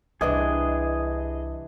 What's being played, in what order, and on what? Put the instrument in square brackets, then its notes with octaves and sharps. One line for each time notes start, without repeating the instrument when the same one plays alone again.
[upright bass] C2 [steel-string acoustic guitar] C3 E3 D4 [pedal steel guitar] G#4 D#5